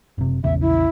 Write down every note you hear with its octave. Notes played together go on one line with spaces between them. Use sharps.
F#1 C3
A#1 E2 C#3 E5
E4